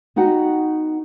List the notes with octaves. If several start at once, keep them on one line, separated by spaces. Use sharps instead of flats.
B3 D#4 F#4 F#5 G5